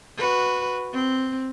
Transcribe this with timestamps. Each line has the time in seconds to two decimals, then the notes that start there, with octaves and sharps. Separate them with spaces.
0.17 F#4 B4
0.93 C4